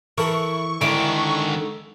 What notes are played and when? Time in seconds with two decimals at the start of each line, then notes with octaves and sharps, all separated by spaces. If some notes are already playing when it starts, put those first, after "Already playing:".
0.18 E3 E4 A4 A#4 C#6
0.81 G#2 D3 D#3 E4 D6